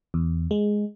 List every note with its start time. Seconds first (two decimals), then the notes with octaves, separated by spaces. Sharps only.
0.14 E2
0.51 G#3